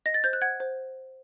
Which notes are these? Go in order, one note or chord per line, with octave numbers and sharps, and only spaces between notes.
D#5 A#6
A6
C5 G6
F#6
F#5 G#6
C5